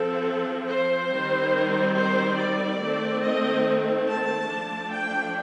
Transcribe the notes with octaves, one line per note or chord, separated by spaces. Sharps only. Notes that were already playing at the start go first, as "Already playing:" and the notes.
Already playing: F3 C4 A4
C5
D#3 G3 C4
C5
D5
D#3 A3 C4
D#5
A5
F3 A3 D4
G5